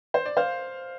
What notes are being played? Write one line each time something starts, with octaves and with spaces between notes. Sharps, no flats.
C5
D5
C5 F5